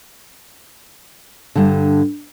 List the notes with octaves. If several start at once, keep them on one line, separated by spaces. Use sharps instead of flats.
G2 D3